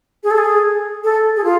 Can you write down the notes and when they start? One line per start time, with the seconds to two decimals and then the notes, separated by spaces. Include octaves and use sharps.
0.24 G#4
0.31 A4
0.38 G#4
1.04 A4
1.36 G#4
1.44 F4